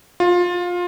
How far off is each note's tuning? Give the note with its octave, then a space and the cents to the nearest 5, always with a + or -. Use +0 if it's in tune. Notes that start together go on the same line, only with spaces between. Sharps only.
F4 +20